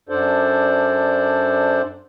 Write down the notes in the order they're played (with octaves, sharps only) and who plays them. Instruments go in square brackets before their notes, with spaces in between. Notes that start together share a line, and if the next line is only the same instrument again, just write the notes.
[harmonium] F#2 D4 A4 C5 D5